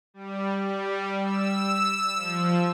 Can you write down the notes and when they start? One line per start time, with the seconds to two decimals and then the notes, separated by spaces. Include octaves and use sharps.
0.14 G3
0.63 G3
1.22 E6
2.15 F3